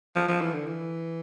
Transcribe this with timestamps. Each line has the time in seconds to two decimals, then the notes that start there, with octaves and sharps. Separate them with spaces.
0.16 F3
0.28 F3
0.41 E3
0.53 D3
0.66 E3